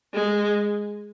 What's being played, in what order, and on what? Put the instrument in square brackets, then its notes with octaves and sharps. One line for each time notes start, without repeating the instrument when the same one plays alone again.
[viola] G#3